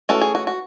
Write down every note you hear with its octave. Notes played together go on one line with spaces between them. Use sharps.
E3 A3 C#4 F#4 A4
G#4
F#4
F#4